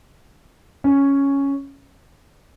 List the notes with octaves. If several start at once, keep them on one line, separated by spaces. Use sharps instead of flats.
C#4